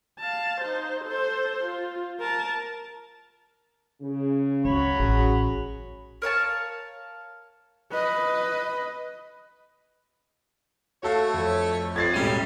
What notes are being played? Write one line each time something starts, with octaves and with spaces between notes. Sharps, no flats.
F5 A5
D#4 C5
A4 C5
F4
A#4 A5
C#3
C#2 F#3 C#5 B5
A1 C#4 F#4 G#4
A#4 C#5 F5 A5
B4 D#5
A3 F#4 A4 C#5 F5
F2
F2 G#6 A6 C7
E1 A2 G3 A3 C#4 D#7